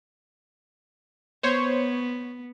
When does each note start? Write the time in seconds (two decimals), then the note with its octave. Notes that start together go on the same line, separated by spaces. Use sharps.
1.43 B3 C5 C#5